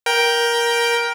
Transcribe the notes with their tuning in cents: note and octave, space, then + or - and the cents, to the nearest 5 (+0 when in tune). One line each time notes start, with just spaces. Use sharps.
A#4 +15 G5 +0